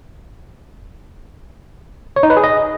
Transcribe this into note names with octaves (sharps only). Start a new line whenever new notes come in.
C#5
D#4
B4
G#4
D#5